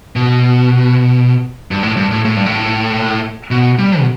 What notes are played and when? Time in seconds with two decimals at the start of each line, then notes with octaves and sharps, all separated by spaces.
0.16 B2
1.71 G2
1.83 A2
1.97 G2
2.11 A2
2.25 A2
2.36 G2
2.46 A2
3.51 B2
3.79 G3
4.00 B2